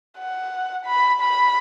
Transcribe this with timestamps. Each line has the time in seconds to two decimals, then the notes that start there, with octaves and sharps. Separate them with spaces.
0.19 F#5
0.86 B5
1.20 B5